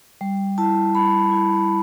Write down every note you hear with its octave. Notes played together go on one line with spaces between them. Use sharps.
G3
E4 A5
G3 B5
E4